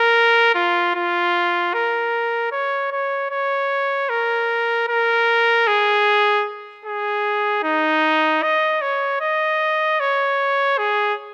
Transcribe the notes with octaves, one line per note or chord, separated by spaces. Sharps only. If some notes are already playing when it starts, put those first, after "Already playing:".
Already playing: A#4
F4
F4
A#4
C#5
C#5
C#5
A#4
A#4
G#4
G#4
D#4
D#5
C#5
D#5
C#5
G#4